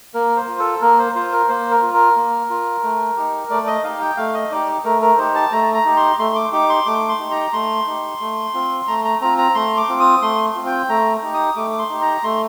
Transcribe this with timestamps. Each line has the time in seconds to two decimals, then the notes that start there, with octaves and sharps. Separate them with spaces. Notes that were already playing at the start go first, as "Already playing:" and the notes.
0.14 A#3 A#4
0.37 C5
0.48 F4
0.59 A4
0.81 A#3 A#4
0.99 C5
1.15 F4 C5
1.32 A#4
1.49 A#3 C5
1.71 A#4
1.82 F4
1.94 A#4
2.16 A#3
2.50 F4
2.83 A3
3.17 D#4 G4
3.50 A3 D5
3.67 D#5
3.84 D#4 G4 F5
4.01 G5
4.17 A3 F5
4.34 D#5
4.51 D#4 G4 D5
4.85 A3 A#4
5.02 A#4
5.18 D#4 G4 C5
5.35 A5
5.52 A3 A#5
5.74 A#5
5.85 D#4 G4
5.96 C6
6.19 A3 C6
6.36 D6
6.53 D#4 G4 D6
6.70 C6
6.86 A3 D6
7.09 C6
7.20 D#4 G4
7.31 A#5
7.53 A3 C6
7.87 D#4 G4
8.20 A3
8.54 C4 F4
8.87 A3 A#5
9.05 A#5
9.21 C4 F4 A#5
9.38 A#5
9.55 A3 C6
9.77 D6
9.89 C4 F4
10.00 D#6
10.22 A3 C6
10.55 C4 F4
10.67 G5
10.89 A3 A#5
11.23 D#4 G4
11.34 D#6
11.56 A3 D6
11.70 D6
11.79 C6
11.90 D#4 G4
12.01 A#5
12.23 A3 C6